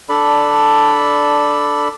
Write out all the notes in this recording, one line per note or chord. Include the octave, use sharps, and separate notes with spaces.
D4 A4 D5 B5